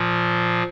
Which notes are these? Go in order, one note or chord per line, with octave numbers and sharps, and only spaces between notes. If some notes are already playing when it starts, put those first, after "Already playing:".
Already playing: A#2 F3